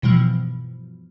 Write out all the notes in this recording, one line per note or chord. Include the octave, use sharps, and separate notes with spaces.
G2 B2 E3 F3